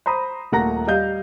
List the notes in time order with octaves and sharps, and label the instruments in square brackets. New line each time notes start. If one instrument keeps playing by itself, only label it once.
[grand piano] C5 A#5 B5 D#6
D#1 A3 A#3 F#5 A#5 A#6
G3 D#5 F5 G6